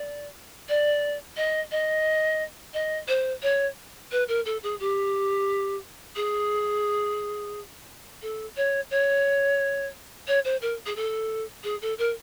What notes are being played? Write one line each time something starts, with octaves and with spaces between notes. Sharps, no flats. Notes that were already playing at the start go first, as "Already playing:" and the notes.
Already playing: D5
D5
D#5
D#5
D#5
C5
C#5
B4
A#4
A4
G#4
G4
G#4
A4
C#5
C#5
C#5
C5
A#4
G#4
A4
G#4
A4
A#4